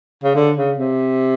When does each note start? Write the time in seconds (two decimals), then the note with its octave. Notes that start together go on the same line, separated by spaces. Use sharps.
0.23 C#3
0.35 D3
0.57 C#3
0.78 C3